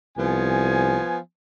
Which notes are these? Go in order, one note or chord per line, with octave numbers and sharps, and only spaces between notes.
C2 F3 B3 G#5